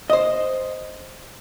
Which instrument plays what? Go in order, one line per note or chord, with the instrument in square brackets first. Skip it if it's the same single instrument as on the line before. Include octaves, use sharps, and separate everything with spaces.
[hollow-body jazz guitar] C5 D#5